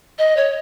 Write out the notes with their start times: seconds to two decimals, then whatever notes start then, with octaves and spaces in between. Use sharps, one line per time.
0.18 D#5
0.37 C#5